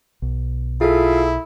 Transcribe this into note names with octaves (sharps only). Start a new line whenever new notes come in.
B1
E4 F4 G#4 A4